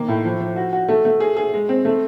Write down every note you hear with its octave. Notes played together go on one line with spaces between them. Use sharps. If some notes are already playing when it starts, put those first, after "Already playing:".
Already playing: D#3 A#3
A2
F3
F3
F#4
F#4
A3
A3
G#4
G#4
G#3
C4
A3